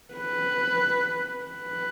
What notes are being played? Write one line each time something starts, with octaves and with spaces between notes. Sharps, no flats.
B4
B4